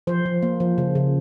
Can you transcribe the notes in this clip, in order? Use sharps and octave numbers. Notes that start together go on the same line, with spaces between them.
F3 C5
F3
A#3
F3
C#3
C#3